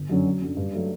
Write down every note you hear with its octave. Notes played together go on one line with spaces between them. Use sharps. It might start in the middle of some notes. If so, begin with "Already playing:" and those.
Already playing: G1
F#2 D3 F#3 C#4
F#2
D3 F#3 C#4
G2
F#3 A3